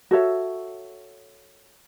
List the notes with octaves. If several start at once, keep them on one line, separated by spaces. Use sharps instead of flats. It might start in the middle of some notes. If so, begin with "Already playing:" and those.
F#4 A4 C#5 E5